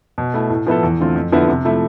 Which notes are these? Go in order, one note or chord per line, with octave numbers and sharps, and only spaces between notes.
B2
A3 E4
A2
F3 B3 E4 A4
E2
D3 A3 C4 F4
F2
D3 F3 B3 E4
C3
F3 A3 E4